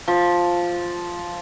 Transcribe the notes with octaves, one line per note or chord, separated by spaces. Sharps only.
F3